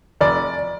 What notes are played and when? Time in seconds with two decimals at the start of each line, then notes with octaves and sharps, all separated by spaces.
0.21 F1 D5